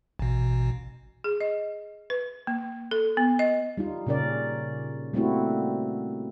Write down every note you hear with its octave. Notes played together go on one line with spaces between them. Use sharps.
A1 B2
G#4
D#5
B4
A#3
A4
B3
D#5
G3 D#4 F4
A#2 C#3 C#4 A#4 D5
G3 A3 A#3 C4 E4 F#4